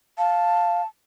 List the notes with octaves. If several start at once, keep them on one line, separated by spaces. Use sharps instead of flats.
F5 A5